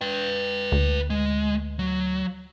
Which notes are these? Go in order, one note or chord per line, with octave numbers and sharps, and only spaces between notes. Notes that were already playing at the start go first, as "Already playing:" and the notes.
B4 G5
D2
G#3
F#3